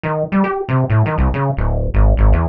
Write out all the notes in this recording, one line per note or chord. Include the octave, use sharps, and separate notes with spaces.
D#3
G3
G4
C3
A2
D#3
C2
C#3
D1
G#1
G#1
E2